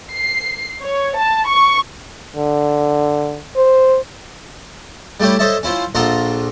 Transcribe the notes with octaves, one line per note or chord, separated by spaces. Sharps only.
C7
C#5
A5
C#6
D3
C5
G3 A3 E4 G4 C#5
A4 C5 C#5 D#5 E5 A5
C#4 E4 F4 C5
A#1 F4 A4 F#5 A#5 C6